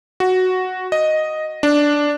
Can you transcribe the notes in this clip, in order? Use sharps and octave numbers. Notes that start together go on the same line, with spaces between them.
F#4
D#5
D4